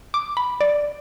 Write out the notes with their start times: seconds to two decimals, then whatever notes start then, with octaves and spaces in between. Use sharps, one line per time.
0.14 D6
0.37 B5
0.61 D5